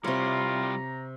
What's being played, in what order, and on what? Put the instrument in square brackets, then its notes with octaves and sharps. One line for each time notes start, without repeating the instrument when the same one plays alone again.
[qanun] C3 C#5 [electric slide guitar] G3 E4 G4 [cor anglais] F4 [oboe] A#5